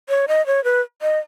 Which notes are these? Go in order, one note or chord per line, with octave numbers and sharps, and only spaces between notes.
C#5
D#5
C#5
B4
D#5